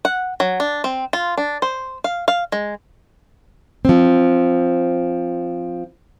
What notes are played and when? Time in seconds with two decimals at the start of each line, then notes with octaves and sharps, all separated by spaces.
0.05 F#5
0.40 F#3
0.60 D4
0.84 C4
1.13 F4
1.38 D4
1.62 C5
2.04 F5
2.28 F5
2.52 G#3
3.85 F3 C4